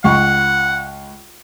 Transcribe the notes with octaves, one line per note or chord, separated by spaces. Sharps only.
C#2 F#5 C#6